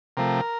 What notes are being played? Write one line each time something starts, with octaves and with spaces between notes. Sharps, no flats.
C3 F3 A3 A#4